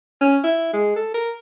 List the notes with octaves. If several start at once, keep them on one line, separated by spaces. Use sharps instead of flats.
C#4
E4
G#3
A4
A#4